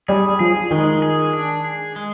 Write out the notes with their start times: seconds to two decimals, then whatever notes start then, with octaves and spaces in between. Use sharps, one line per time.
0.08 G3 G#4
0.39 F3 G#4
0.71 D#3 G#3
1.02 G#4
1.33 D4
1.64 G#4
1.96 G#3